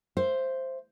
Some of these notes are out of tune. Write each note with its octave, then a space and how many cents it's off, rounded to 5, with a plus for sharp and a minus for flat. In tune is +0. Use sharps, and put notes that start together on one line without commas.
C5 +0 E5 +30